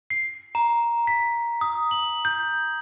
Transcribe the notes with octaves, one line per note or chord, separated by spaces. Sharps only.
C7
A#5
B6
D#6
F#7
G6